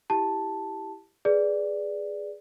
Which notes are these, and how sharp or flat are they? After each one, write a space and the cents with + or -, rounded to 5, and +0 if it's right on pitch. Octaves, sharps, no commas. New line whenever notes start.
E4 +0 G4 +0 A5 +0
G#4 +0 B4 +0 D5 +0